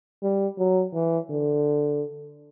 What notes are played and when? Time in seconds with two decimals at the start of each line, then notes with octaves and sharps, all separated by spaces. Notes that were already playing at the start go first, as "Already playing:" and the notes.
0.22 G3
0.58 F#3
0.93 E3
1.29 D3